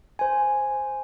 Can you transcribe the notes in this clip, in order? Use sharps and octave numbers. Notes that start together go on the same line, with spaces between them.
C5 G#5